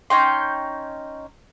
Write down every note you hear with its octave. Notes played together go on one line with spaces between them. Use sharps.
C#4 D#4 G5 C6